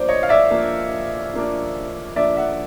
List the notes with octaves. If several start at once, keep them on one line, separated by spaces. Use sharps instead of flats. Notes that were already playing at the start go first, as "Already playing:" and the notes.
Already playing: F3 A#3 D4 C5 D5
C#5 D#5
F5
D5 E5
F3 A#3 D4
F3 A#3 D4
F3 A#3 D4 D5 E5
E5 F#5